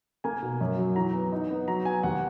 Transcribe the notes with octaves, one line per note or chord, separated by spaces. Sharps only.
A#3 G#5
B2
F#2
F#3
E3 A#5
B3
D#4
B3
F#3 A#5
B3 G#5
D#2 F#5